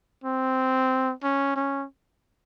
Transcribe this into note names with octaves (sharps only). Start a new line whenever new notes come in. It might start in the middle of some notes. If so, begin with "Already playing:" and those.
C4
C#4
C#4